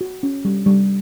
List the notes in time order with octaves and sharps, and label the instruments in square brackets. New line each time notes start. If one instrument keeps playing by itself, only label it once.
[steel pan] F#4
C#4
G3
G3